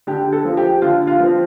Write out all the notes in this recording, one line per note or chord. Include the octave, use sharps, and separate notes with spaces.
D3 G4
A4
F3 C4
G4
D3 F4
F4
F3 C4